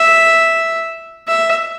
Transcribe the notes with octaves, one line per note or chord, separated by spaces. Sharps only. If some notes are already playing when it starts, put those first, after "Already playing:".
Already playing: E5
E5